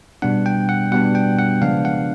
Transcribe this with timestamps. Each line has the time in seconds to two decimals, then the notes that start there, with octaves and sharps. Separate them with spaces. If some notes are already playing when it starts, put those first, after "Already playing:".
0.22 B2 G3 B3 D4 F#5
0.46 G5
0.69 F#5
0.92 B2 G3 B3 D4 F#5
1.15 G5
1.39 F#5
1.61 C#3 F3 G#3 B3 D4 F5
1.85 F#5